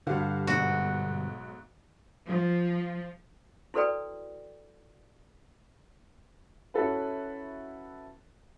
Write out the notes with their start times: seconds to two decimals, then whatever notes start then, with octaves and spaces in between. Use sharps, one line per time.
0.07 G2 D3 F#4 G4 F5
0.47 B1 G#2 F#4
2.27 F3
3.74 E4 F#4 A4 B4 D5 G5
6.74 C#4 E4 F#4 A4 B4